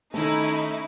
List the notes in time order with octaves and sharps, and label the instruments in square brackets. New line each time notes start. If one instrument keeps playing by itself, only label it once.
[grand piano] D#3 A3 [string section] C#4 D#4 E4